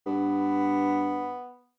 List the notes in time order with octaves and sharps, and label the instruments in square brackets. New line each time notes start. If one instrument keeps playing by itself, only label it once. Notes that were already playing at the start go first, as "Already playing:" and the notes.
[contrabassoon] G2 [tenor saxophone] B3